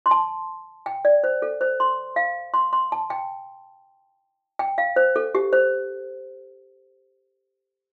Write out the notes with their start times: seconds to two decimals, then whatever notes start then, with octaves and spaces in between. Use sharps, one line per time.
0.06 C6
0.11 A5
0.86 G5
1.05 D5
1.24 C5
1.42 A4
1.61 C5
1.80 C6
2.16 F5
2.54 C6
2.73 C6
2.92 A5
3.10 G5
4.59 G5
4.78 F5
4.96 C5
5.16 A4
5.35 G4
5.53 C5